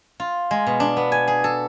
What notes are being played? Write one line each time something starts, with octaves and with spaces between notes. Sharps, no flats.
F4
G#3
B2
D4
B3
G#5
G#4
A4